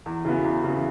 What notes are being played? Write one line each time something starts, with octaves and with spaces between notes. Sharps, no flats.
E2
C#3 E3 B3 F#4
E2
C#3 E3 B3 F#4